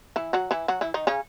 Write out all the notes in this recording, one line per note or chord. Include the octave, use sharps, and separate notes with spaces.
E3 E4
F#3 F#4
E3 E4
F#3 F#4
E3 E4
D#3 D#4
C#3 C#4